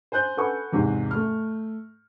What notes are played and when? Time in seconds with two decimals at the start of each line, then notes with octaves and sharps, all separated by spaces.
0.12 C5 G#5 F#6 G6
0.37 A4 B4 F#5 G#5 C#6
0.72 E2 G#2 C3
1.11 A3 F6